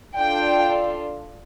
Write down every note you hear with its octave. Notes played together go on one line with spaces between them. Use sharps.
D4 F4 A4 G5